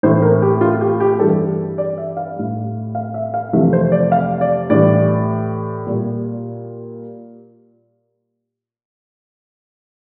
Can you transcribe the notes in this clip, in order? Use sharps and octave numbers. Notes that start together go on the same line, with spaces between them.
A2 E3 A3 C5
A#4
G4
F4
G4
G4
G2 E3 G3 A4
D5
E5
F5
A2 G3
F5
E5
F5
F2 C3 E3 A3 E5
C5
D5
F5
D5
A2 E3 G3 D5
A#2 G3